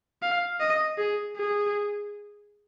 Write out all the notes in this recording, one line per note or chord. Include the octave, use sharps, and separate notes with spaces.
F5
D#5
G#4
G#4